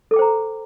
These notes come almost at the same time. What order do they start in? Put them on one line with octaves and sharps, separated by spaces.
A4 D6 G5 C5 A#5